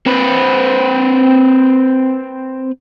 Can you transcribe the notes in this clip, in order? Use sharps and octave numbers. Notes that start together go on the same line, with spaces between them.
C4 B4